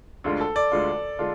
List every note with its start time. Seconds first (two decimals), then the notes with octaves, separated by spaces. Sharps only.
0.24 D2 D3 G#3 D4 F4
0.41 A4
0.56 D5
0.72 D2 D3 G#3 D4 F4
1.19 D3 G#3 D4 F4